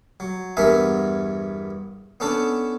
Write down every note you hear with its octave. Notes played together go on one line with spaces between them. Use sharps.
F#3
E2 G2 B3 A#4 E5 G#5
B3 C#4 D4 A4